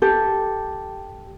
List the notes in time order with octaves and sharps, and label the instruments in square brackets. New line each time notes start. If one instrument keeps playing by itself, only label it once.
[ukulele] G4 A4